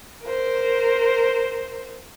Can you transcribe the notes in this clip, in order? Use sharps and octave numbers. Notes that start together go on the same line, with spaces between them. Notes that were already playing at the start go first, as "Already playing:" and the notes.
A#4 C5